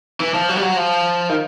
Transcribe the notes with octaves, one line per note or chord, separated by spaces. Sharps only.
E3
F3
F#3
G3
F#3
F3
D#3